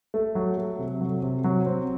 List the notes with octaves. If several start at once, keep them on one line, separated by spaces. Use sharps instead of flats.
A3
F#3
A3
C3
F#3
C3
F#3
C4